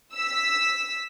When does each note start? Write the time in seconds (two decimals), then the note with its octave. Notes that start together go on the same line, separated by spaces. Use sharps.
0.16 E6 B6